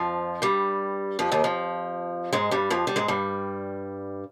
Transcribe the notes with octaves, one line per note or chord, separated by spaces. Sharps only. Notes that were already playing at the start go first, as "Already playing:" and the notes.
Already playing: F2 F3
G2 G3
F2 F3
D#2 D#3
F2 F3
G#2 G#3
G2 G3
F2 F3
G3
G#2 G#3
G2 G3